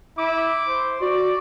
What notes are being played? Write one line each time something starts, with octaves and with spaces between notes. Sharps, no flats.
E4 D6
C5
F#4 D5